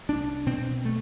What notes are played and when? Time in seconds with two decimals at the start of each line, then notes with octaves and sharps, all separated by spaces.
0.09 C2 D4
0.46 B2 C4
0.85 A3